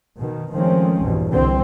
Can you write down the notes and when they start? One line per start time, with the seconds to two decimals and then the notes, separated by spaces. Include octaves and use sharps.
0.16 B2 D#3
0.55 D#3 F3 G#3 A3 C4 C#4
1.01 A#1 E2 G2 B2
1.31 C2 B2 D3 C4